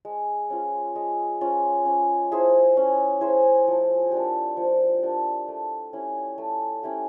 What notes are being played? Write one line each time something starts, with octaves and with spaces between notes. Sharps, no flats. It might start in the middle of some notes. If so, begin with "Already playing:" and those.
G#3
C#4 F4
G#3
C#4 F4
C#4
E4 G#4 C5
C#4
E4 G#4 C5
F3
A#3 D4 G4
F3
A#3 D4 G4
A3
C#4 E4 G4
A3
C#4 E4 G4